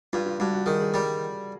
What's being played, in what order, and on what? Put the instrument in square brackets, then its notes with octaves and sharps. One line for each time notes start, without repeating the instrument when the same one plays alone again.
[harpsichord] G2 [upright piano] F4
[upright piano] F4
[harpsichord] G2 [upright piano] F#4
[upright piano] F#4
[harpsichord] D#3 [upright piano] G#4
[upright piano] G#4
[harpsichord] G3 [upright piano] A#4